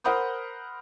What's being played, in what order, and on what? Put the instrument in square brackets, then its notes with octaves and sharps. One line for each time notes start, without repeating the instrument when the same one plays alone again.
[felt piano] A#4 C5 F#5 B5 D#6 G6